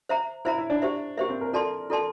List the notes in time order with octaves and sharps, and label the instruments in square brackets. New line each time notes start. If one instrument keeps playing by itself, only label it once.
[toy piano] C5 E5 A#5
[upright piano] E4 [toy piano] C5 E5 A#5
[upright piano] E4
D4
[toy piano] G4 C5 E5
[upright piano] A#3 [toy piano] G4 C5 E5
[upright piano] C4
A#4
[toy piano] E4 A4 D5 A5 C6 [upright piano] A#4
[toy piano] E4 A4 D5 A5 C6